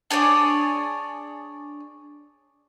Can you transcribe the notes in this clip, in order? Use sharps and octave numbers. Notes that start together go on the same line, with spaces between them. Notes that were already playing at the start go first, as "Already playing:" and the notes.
D4 G#4 C#5 D5